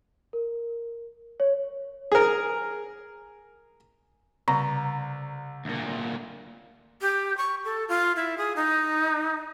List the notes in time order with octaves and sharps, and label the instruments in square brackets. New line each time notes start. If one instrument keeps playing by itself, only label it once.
[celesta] A#4
C#5
[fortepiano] G#4 A#4
[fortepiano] C2 [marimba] C#3 [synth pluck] A#5
[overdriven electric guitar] D2 A#2
[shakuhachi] G4
C#6
A4
F4
E4
G#4
D#4